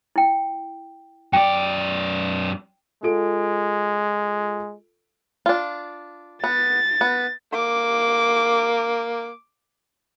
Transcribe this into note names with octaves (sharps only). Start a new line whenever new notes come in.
E4 G5
F#2 D5 G5
G#3 F4 A4 D7
D4 F4
B3 A6
B3
A#3 D6